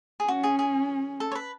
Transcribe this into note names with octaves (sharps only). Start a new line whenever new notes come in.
G#4
C#4 F#4
G#4
G#4
A4
C#5
B4